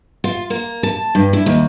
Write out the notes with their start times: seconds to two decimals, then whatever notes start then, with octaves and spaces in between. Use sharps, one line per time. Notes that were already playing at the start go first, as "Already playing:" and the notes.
0.24 F4
0.50 A#3
0.83 A5
1.15 G2
1.33 E4
1.46 D#2